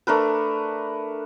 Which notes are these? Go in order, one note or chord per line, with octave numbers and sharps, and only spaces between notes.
A3 D4 A#4 B4